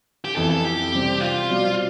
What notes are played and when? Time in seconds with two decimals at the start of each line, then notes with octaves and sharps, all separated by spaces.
0.24 G4
0.36 F2 E3 B3 A4
0.50 A4
0.65 G4
0.93 C3 G3 C4
1.21 F4
1.50 B2 G3 C4